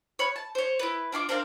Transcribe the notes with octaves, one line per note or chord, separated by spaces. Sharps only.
C#5 B5 F#6
A5
C5 C#5
E4 B4
D4 F4 C6 D6
C4 D4 A#4 F5